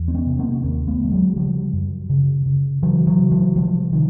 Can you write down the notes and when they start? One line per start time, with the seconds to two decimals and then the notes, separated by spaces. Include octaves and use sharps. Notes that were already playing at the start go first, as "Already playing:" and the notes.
Already playing: E2
0.08 C4
0.14 B3 C#4
0.27 C3
0.39 A#3 C4
0.53 C#4
0.63 D#2 A#3 C4
0.87 A3 B3
1.00 D3
1.05 G3
1.12 F#3 G#3
1.36 C#3 F3 G3
1.73 F#2
2.10 C#3
2.46 C#3
2.83 C#3 E3 F#3
3.07 E3 F#3
3.19 C#3
3.32 E3 F#3
3.55 C3 F3 G3
3.92 C3 D#3 F3